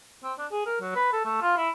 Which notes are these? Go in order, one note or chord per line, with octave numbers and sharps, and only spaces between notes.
C4
D4
G#4
A#4
F#3
B4
A4
A3
F4
E4